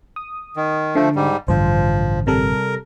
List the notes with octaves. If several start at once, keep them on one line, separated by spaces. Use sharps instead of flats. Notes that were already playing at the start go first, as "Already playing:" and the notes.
D#6
D#3
D3 F3 A3
G#2 G3
A1 G2 D3 F3 C5
C3 G3 A4 A#4